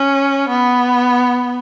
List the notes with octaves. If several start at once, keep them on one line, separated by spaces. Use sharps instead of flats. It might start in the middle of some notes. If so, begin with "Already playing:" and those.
Already playing: C#4
B3